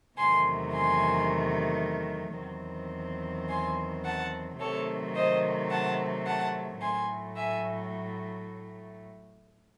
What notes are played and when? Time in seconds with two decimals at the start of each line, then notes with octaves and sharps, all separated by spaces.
0.17 E2 C3 D#3 F#3 A3 G#5 C6
0.73 G#5 C6
2.39 E2 D#3 F#3 C4
3.49 G#5 C6
4.05 F#5 A5
4.60 C3 D#3 F#3 A3 C4 A4 C#5
5.15 C5 D#5
5.70 F#5 A5
6.26 F#5 A5
6.81 A2 F#3 A3 G#5 C6
7.37 E5 G#5